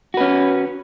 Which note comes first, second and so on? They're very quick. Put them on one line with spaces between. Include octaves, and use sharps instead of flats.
F#4 B4 C#4